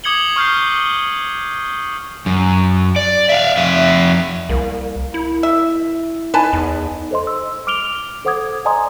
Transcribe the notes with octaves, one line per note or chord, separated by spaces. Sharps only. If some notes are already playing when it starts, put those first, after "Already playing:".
D6 D#6 G#6 C#7 F#7 G7
C#6 F6 G6 C7
F#2
D5
E5 F5
F2 E5
C2 A#3
E4
E5
D#4 B4 G#5 A5
E2
A4 C5 D#5 C6
E6
D6 F6 D7 F7 G7
A4 C5 F#5 D6 D#6 G#6
D5 D#5 G#5 A#5 C6 D#6